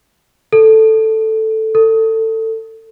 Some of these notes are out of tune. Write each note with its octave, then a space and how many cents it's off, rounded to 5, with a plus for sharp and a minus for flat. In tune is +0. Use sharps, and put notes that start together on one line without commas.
A4 +0
A4 +20